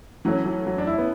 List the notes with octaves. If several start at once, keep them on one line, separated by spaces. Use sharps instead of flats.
E3 F#3 A3 C#4
F#3
F#3
D4
E4
B3